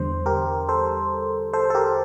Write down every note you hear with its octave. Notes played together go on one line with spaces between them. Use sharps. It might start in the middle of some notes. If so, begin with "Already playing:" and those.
Already playing: E2 D3 G3 C5
G4 A#4
A4 C5
A4 C5
A4
G4 A#4